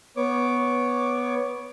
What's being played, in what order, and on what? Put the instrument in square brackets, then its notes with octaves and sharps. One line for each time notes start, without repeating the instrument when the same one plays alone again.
[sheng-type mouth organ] B3 C#5 D6